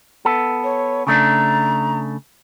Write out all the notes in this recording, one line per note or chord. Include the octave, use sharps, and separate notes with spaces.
B3 A4
C#5
C#3 A3 D4 A#5